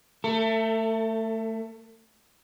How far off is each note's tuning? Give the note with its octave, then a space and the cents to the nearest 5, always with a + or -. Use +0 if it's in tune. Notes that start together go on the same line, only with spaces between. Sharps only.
A3 +15 A4 +40